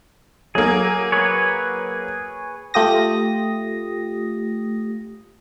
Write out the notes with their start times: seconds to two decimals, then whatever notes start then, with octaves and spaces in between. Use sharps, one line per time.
0.55 F#3 A#3 G#4
1.12 G#4 B4 C#5
2.74 A3 F4 G4 D#6 A#6